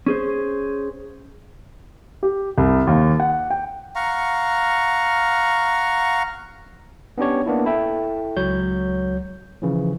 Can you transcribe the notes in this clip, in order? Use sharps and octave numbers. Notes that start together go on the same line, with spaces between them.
C#4 G#4 C5
G4
C2
D#2
F#5
G5
F5 F#5 A#5 C#6
B3 C#4 D4 G4 C#5
A#3 B3 D4 E4
E4 A4 E5 G5
C#2 F#3 C#5 G6
C#3 E3 F3